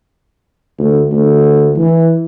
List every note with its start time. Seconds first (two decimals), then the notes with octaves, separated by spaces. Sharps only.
0.79 D2
1.11 D2
1.77 E3